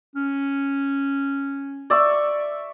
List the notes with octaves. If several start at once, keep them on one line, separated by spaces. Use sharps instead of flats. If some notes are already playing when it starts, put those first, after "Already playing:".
C#4
D5 E5 C#6